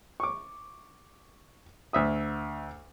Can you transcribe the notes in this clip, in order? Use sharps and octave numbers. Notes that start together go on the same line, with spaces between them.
C#6 D6
D2 E5 D#6